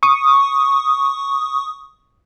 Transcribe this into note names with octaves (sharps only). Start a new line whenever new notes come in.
C#6 D#6